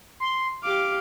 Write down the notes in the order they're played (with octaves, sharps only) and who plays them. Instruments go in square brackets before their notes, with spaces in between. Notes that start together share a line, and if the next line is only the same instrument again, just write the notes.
[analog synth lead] C6
[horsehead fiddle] G4 F5 [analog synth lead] D6